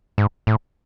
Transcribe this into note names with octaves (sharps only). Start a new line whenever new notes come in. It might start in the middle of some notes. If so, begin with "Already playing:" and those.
G#2
A2